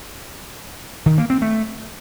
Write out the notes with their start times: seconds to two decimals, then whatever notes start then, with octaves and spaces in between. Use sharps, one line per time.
1.06 D#3
1.18 A#3
1.30 C4
1.42 A3